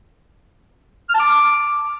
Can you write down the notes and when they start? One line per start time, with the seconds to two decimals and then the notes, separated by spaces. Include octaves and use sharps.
1.09 F6
1.14 A5
1.20 D6